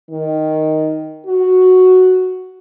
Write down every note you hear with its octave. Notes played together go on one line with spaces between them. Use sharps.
D#3
F#4